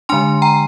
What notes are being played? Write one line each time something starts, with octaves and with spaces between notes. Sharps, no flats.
D3 G#3 D4 G#5 C6
G5 A#5